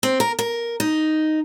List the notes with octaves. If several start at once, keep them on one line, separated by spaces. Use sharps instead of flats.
C4
A#4
A#4
D#4